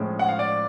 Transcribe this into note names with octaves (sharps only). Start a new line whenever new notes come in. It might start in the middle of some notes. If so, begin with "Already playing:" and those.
Already playing: A2 F3 G#3 C#4
F#5
F5
D5